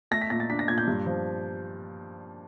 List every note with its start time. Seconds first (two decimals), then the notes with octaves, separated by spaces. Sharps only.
0.11 A3 A#6
0.21 B6
0.30 A#2 A#6
0.40 A6
0.50 D4 B6
0.59 A#6
0.68 A#2 G#6
0.78 G6
0.88 G2
1.06 F3